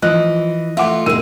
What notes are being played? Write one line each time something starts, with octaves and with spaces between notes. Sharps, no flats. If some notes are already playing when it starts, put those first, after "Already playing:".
E3 F3 D#5 F#6
A3 F4 E5 F#5 D6
E1 G#3 A#3 E6 D#7